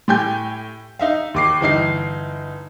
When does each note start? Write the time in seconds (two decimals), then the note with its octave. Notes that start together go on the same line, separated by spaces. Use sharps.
0.08 A2 G4 G#5 G6
0.99 D#4 E5 F5
1.34 D#2 D6 C7
1.61 G1 E3 D#4 C7